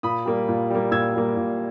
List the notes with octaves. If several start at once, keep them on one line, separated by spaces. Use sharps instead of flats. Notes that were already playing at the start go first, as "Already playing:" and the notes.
A#2 B5 D#6
G3 A#3
A#2
G3 A#3
A#2 E6 G#6
G3 A#3
A#2